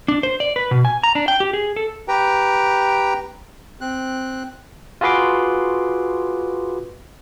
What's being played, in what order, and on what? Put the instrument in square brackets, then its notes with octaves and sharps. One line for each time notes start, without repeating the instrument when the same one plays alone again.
[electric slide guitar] D4
C5
D5
B4
B2
G#5
A#5
D4
G5
G4
G#4
A4
[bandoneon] G4 B4 G5 A#5
C4 F#6
[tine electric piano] F4 F#4 G#4 B4 C6 D6